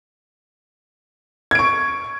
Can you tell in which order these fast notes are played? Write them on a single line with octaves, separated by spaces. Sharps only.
G#6 D7 C#6